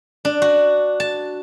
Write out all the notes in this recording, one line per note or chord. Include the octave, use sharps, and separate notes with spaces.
D4
F#4
A5